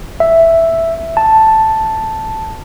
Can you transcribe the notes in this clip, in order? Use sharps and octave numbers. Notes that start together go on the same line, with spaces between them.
E5
A5